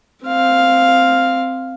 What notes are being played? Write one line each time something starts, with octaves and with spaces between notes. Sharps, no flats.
C4 F5